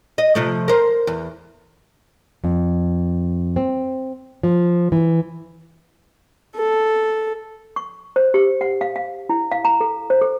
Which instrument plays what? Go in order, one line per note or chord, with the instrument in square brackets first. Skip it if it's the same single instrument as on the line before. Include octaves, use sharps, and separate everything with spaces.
[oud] D#5
C3 F3 A3
A#4 C5
E2
[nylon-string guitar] F2
C4
F3
E3
[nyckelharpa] A4
[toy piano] C#6
C5
G4
F#5
F5
F5
E4
F5
A#5
A4
C5
A4